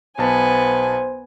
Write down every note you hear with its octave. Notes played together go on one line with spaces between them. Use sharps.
B1 B3 C5 G#5 A5